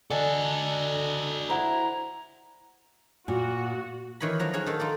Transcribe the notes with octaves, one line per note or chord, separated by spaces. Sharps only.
D3 F#4 A4 D#5 G#5 A5
E4 C5 F#5 A#5
A#2 F#4
D#3 E3 C#5 D#5 B5
F3 F#3 A#5
F#4 G#4 C#5 F5
D#3 A4
D#4 F4 D5